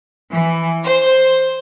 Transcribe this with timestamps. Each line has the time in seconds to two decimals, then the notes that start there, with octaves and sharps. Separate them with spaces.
0.33 E3
0.84 C5